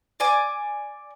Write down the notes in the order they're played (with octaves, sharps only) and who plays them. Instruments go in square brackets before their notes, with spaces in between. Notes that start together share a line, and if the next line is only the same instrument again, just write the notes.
[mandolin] D5 G#5 D6